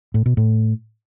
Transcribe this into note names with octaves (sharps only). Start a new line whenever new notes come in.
A2
B2
A2